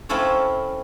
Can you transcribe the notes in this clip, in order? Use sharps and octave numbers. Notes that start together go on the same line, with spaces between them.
C4 C#4 E4 F4 A4 C#5